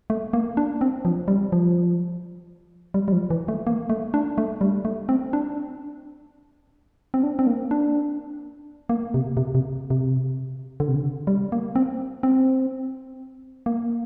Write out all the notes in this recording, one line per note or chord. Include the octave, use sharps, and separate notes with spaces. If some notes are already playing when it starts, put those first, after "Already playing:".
A3
A#3
D4
C4
F3
G3
F3
G3
G3
F3
E3
A3
A#3
A3
D4
A3
G3
A3
C4
D4
C4
D4
C4
A#3
D4
A#3
C3
C3
C3
C3
D3
C3
D3
G3
A#3
C4
C4
A#3